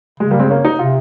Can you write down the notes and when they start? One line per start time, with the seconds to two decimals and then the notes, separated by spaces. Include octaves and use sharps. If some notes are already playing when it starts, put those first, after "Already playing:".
0.20 C#3 G#3
0.31 G3 A#3
0.40 G#3 C4
0.50 A#3 C#4
0.65 D#4
0.79 C3 F4